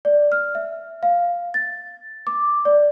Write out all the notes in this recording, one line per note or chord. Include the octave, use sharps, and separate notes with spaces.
D5
F6
E5
F5
A6
D6
D5